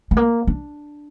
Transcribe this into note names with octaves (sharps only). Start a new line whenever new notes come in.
A3
A#3
D4